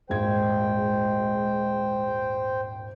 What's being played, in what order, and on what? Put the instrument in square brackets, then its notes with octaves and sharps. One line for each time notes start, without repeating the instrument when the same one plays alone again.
[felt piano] D#1 G#1 G#6 [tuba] G#3 [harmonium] C5 G5